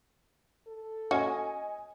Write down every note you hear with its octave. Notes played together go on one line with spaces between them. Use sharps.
A4
C#4 F#4 D#5 G#5